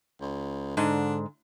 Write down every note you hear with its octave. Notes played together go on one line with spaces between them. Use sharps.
C#2
G#2 D3 D4